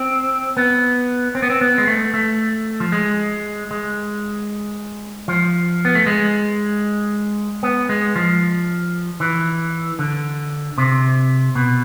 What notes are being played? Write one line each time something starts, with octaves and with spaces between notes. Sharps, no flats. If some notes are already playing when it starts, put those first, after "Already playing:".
Already playing: C4
B3
C4
B3
C4
B3
G#3
A3
A3
F3
G#3
G#3
F3
B3
A3
G#3
B3
G#3
F3
E3
D3
C3
B2